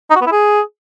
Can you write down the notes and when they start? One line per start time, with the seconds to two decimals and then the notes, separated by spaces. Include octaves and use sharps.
0.10 D#4
0.16 F#4
0.21 B3
0.26 E4
0.32 G#4